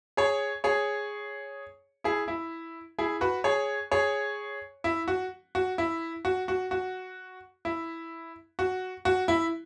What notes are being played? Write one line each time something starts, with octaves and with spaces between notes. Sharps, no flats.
G#4 C#5
G#4 C#5
E4 G#4
E4
E4 G#4
F#4 B4
G#4 C#5
G#4 C#5
E4
F#4
F#4
E4
F#4
F#4
F#4
E4
F#4
F#4
E4